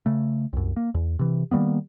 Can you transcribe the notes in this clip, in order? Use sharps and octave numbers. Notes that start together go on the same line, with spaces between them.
C#3 A3
C2 F#2
A#3
E2
C3 E3
D#3 G3 A#3 B3